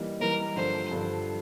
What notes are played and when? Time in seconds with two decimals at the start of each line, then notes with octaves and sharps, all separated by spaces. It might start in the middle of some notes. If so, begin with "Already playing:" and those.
Already playing: E3 G3 A#3 D#4
0.20 E3 G3 A#3 D#4 A#4
0.55 G2 D3 F3 C5
0.91 G2 D3 F3